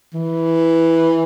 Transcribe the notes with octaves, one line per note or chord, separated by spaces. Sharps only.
E3